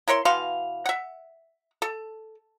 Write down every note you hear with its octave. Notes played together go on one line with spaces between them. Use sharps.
E4 A#4 C#5 C6
B2 E3 F5 C6
E5 F#5
A4